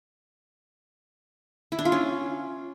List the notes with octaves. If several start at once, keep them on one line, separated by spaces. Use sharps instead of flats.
E4
D4
F4
C#4